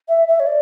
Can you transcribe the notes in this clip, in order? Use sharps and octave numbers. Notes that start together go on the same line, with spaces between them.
E5
E5
C#5
D5